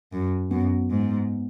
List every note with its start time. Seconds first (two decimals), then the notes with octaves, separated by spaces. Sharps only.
0.12 F#2
0.51 F#2 B3
0.91 G#2